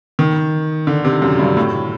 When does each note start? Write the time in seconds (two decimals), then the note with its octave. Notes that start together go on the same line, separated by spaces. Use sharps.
0.19 D#3
0.87 D3
1.05 C3
1.22 F#2
1.39 G2
1.57 A2